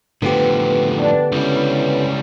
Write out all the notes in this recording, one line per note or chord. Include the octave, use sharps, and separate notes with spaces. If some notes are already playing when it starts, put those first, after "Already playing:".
A2 D3 F3 B3 G4 B4
D4
C#2 G3 C#4 E4